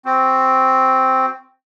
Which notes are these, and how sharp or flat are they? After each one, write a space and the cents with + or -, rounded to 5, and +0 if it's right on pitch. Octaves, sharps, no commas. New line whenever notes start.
C4 +0 F#4 -5